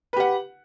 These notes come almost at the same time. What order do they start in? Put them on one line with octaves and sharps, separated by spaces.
B4 G4 F#5